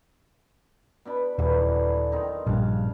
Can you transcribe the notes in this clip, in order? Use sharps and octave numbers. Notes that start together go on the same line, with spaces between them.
B2 D4 B5
D#1 D3 E3 F#3
D#3 C4 D#4
A#1 G2 C#3 D4 F5